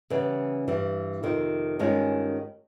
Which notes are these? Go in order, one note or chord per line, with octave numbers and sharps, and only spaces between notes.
C#3 E3 G3 B3
G2 E3 G3
F2 C3 D#3
G2 D#3 G#3 C#4 F4